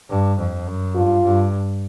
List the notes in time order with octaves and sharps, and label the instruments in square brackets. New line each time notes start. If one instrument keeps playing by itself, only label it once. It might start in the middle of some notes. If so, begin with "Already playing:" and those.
[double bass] G2
F2
F#2
[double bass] G2 [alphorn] F4
[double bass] G2